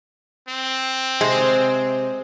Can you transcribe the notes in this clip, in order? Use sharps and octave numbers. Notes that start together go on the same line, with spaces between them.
C4
C3 G#3